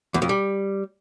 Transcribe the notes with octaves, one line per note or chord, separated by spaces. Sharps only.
E2
F2
G3